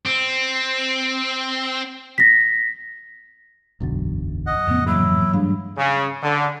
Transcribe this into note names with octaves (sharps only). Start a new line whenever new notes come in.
C4
A#6 B6
E1 B1 F#2 D3 F#3
D#5 F#5
F2 A2 C#3 B3
G#2 E3 F#3 A#3 E4
G2 G3 G#3 D4 F5 B5
C#3
D3